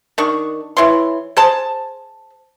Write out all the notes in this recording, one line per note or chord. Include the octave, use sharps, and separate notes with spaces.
D#3 D4 C#6
E3 E4 C#5 C6
G#4 C5 A5